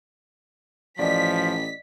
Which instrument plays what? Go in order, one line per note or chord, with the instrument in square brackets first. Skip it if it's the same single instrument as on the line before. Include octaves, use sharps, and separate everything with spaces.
[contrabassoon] A1 [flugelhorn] F3 [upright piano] D5 D#5 [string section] B6